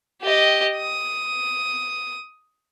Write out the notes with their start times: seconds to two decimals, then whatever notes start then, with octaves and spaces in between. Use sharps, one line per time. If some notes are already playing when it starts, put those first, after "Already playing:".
0.22 G4 D#5
0.77 D#6